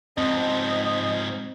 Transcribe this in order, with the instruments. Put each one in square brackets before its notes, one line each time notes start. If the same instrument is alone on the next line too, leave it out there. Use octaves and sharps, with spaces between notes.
[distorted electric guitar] G#2 F3 [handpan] C4 [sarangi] D#5